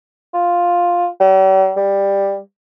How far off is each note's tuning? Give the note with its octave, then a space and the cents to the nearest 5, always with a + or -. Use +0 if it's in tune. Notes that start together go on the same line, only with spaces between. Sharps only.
F4 +5
G3 -45
G3 +10